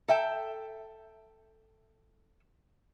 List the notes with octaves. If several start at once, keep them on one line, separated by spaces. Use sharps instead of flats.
A4 E5 G5